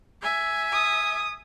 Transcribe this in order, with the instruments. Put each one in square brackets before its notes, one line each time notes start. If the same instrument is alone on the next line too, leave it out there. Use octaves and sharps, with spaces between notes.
[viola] E5 G#5
[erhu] D#6